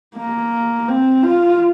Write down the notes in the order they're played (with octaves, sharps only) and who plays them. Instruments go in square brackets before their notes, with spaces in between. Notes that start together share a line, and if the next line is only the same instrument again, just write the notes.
[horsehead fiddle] A#3
C4
F4